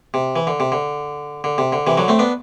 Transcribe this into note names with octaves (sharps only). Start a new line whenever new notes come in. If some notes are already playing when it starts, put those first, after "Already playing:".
C3
E3
D3
C3
D3
D3
C3
D3
C3 E3
D3 F#3
A3 C4
B3 D4